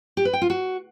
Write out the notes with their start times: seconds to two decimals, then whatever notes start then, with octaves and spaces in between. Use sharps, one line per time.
0.17 G4
0.25 B4
0.33 G5
0.42 F4
0.50 F#4